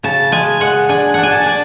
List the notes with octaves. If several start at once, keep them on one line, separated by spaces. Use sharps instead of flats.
C#3 A5
G#3 G#5
G#3 F#5
D4 G#5
D4 F#5
G#5
A5
D4